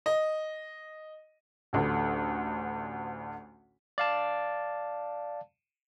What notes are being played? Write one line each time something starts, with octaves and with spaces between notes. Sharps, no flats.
D#5
A1 D2 D3
D5 F5 A5